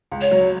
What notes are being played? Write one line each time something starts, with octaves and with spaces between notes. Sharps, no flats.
C#2
C#5
F#3